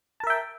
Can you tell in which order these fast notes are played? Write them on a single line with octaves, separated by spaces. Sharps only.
A5 A#4 E5 G5